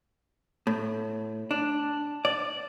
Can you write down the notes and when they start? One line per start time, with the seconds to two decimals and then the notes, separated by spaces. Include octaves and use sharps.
0.67 A2
1.51 D4
2.25 D5